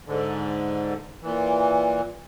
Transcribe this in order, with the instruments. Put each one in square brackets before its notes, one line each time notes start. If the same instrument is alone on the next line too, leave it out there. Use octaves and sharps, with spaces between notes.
[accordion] G#2 D3
A#2 E3